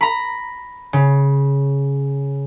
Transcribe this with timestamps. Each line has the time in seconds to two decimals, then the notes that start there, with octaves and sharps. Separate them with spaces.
0.01 A#5 B5
0.93 C#3